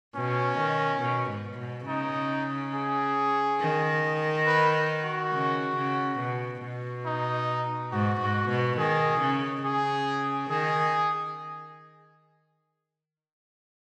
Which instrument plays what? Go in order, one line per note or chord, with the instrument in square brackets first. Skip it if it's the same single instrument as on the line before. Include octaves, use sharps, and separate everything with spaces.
[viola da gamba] B2 [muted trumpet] C#4
[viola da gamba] D#3
B2
G#2
B2
[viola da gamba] C#3 [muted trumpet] D#4
[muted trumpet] G#4
[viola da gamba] D#3
[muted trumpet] B4
F#4
[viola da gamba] C#3
C#3
B2
B2
[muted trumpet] D#4
[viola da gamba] G#2 [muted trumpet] F#4
[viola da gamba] G#2
B2
[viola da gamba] D#3 [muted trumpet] G#4
[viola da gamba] C#3
[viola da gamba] C#3 [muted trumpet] G#4
[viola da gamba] D#3 [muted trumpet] G#4